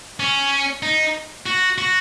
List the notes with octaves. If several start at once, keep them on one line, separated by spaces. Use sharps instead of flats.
C#4
D#4
F#4
F#4